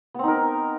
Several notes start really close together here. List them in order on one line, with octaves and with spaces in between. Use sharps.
B3 C4 D#4 A#4